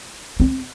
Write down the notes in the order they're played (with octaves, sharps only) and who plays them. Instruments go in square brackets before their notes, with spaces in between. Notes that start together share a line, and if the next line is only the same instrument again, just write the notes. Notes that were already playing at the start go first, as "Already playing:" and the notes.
[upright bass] C4